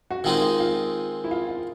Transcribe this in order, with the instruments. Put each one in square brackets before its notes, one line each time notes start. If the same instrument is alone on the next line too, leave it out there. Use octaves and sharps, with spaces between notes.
[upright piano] F#4
[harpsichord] D#3 G#3 C4 D#4 [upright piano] F4
[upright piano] F4
F4
E4
F4
F4